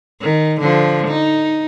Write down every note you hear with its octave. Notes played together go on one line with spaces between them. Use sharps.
D#3
D3 F3
D#4